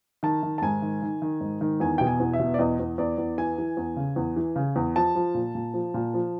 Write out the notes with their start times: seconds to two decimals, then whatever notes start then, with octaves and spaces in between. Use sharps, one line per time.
0.23 D#3 A5
0.43 D#3
0.58 A5
0.62 G#2 G#5
0.82 D#3
1.02 D#3
1.22 D#3
1.41 G#2
1.61 D#3
1.80 E2 G#5
1.98 B2 G5
2.07 G#5
2.20 E2
2.33 E5
2.39 B2
2.54 D5
2.59 E2 D#5
2.80 E2
2.98 E2 D5
3.18 E2
3.38 E3 G#5
3.58 E3
3.77 E2
3.96 C#3
4.16 E2
4.36 E3
4.56 C#3
4.76 E2
4.96 F3 A5
5.15 F3
5.34 A#2
5.55 A#2
5.74 F3
5.94 A#2
6.14 F3